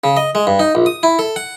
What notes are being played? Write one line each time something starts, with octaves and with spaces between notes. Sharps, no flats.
C#3
D#5
G#3
G2
D#4
A#1
D#6
E4
A4
F#5